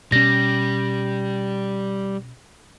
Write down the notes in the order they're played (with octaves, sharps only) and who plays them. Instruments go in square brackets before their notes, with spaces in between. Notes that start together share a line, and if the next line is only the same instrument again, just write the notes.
[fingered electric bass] B2 C#4 [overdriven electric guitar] G3 [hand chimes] A#6